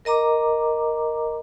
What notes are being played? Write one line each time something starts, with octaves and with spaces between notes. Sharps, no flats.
A#4 D#5 A#5 D6